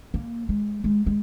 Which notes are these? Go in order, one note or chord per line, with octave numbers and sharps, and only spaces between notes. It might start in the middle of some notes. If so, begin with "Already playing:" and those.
A#3
G#3
G#3
G#3